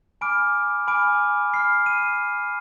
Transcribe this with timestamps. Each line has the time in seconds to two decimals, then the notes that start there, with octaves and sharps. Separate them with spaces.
0.21 G#5 B5 D6 F6 D7
0.87 G#5 B5 D6 F6 D7
1.53 B5 F6 C7
1.86 D#7